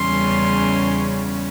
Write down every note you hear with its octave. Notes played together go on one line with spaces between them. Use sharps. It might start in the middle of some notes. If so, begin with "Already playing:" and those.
Already playing: E2 C#3 G3 C#4 C6